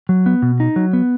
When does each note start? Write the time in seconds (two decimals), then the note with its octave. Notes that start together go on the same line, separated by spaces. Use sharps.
0.09 F#3
0.26 B3
0.42 B2
0.60 D#4
0.76 F#3
0.93 B3